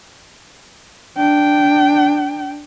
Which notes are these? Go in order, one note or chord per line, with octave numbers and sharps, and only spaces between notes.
D4 G5